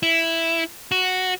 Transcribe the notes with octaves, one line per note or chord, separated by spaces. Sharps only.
E4
F#4